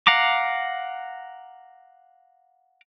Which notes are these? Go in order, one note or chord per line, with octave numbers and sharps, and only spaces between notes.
F5 F#5 A#5 D6